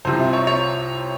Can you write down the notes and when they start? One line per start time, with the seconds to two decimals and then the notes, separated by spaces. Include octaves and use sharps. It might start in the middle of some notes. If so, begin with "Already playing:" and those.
0.05 C2 C3 F3 C5
0.20 E5
0.33 C#5
0.47 C#5